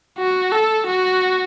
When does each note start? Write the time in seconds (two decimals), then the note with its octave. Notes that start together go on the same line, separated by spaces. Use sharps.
0.18 F#4
0.52 A4
0.86 F#4